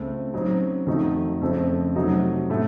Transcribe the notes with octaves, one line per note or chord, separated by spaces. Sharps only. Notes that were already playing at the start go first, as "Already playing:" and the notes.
Already playing: C#2 C#3 A3 C4
C#3 F#3 C4 D#4 F#4
F2 D#3 A3 D#4 F#4
F2 C#3 A3 C4
C3 F#3 A3 D#4 F#4
A2 A3